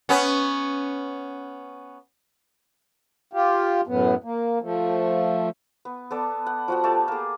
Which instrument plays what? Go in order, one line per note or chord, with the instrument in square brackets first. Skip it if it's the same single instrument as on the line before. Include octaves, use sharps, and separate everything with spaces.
[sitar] B3 C#4
[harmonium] F4 G4
F#2 A2 B3
A#3
F3 A3
[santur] B3
B3 A4 D5
F#5
F3 F#4 F#5
A3 G4 A5
A#3 G#4